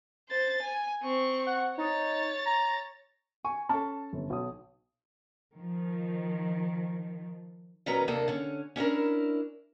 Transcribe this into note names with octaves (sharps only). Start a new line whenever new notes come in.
C5 A6
G#5
C4 C#6
F#5
D#4 C#5 A6
A#5
G#5 C#6
C#4 A4 A5
G1
B1 D#6
D#3 F3
A#2 D#3 F#3 C#4 B4 A#5
D#2 C3 A#3 D4 A4
D3 C#4
C#4 D4 E4 A#4